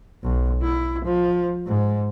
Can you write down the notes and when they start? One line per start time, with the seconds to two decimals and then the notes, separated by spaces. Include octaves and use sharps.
0.23 B1
0.62 E4
1.05 F3
1.66 G#2